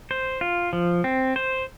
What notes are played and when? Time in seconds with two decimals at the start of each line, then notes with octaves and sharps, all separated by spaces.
0.11 C5
0.41 F4
0.73 F3
1.04 C4
1.36 C5